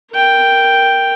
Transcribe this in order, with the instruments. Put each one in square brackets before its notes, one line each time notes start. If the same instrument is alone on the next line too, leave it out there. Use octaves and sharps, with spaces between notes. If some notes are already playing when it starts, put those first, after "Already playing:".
[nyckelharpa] A#4 G5